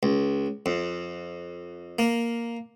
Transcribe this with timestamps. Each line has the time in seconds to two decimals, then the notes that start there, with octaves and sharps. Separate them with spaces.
0.03 C#2
0.66 F2
1.99 A#3